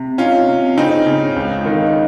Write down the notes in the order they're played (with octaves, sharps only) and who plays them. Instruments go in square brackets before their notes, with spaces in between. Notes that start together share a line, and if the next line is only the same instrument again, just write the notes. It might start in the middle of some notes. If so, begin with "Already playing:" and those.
Already playing: [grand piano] C3
[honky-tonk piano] C#4 F4 [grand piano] D#4
[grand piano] C3
[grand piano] C#3 [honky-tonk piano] C4 D#4
[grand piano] C#3
C#2
D#3